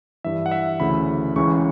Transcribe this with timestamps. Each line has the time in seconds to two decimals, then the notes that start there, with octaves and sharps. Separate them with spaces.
0.24 G2 E3 E5
0.46 F#5
0.52 E5
0.80 D2 C#3 E3 B5
1.36 C#2 C#3 E3 C#6